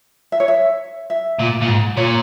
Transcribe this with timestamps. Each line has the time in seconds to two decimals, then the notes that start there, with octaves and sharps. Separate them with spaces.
0.32 E5
0.40 C#5
0.48 E5
1.10 E5
1.39 A#2
1.61 A#2
1.68 G#2
1.97 A#2 C#5